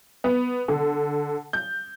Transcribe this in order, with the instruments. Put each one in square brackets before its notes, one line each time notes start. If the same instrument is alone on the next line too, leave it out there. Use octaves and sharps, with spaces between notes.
[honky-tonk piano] B3
D3
G6